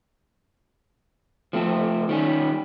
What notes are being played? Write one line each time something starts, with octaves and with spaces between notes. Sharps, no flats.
F3 A3 C4
D#3 G3 C#4